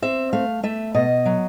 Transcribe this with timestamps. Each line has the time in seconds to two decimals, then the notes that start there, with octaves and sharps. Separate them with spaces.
0.02 C4 E5
0.33 A3 F5
0.63 A3 E5
0.94 B2 D#5
1.25 F#3